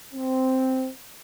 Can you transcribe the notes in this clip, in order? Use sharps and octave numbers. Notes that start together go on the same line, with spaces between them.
C4